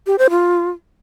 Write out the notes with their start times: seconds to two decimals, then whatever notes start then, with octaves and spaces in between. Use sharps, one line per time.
0.07 G4
0.18 C5
0.30 F4